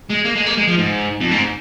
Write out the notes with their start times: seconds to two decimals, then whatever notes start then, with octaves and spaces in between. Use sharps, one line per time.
0.10 G#3
0.25 A#3
0.36 G#3
0.46 A#3
0.57 G#3
0.67 F3
0.78 G#2
1.21 F2
1.31 G#2